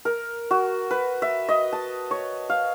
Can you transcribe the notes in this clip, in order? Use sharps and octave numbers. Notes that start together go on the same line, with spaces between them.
A#4
F#4
B4
E5
D#5
A5
C#5
F5